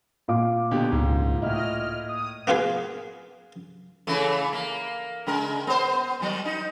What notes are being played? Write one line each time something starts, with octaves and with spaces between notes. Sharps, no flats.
A#2 F5 D6
B2 D3 G4
C#2 G#2
A2 E4 D#5 F6
D#6
A#3 B3 F4 G#4 B4
C#3 E3 A3
A#3
C#3 G#3 A#4
B3 C5
D#3 F#3
D#4